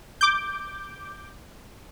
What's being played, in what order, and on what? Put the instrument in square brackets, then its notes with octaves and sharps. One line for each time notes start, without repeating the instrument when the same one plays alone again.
[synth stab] D6 G6